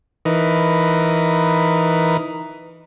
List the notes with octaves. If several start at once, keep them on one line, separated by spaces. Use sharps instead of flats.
E3 D#4 A#4 B4